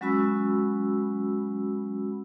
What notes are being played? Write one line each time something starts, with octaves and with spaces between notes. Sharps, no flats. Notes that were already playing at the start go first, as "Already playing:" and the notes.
F#3 G#3 C#4 F#4 B5 E6